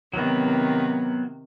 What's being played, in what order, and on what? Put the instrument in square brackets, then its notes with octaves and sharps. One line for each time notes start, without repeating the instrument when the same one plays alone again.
[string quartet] C3 D#3 [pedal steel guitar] F#3 B3